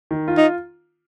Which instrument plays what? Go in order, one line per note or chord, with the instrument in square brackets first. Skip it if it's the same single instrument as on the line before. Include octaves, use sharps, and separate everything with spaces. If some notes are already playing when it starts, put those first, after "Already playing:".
[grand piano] D#3
F4
[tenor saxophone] D#4